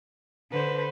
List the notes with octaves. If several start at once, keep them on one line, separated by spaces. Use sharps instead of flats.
D3 B4 C5